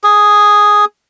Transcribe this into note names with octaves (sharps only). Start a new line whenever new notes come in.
G#4